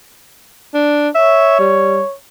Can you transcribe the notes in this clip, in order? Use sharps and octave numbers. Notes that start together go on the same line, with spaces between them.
D4
C#5 E5
G3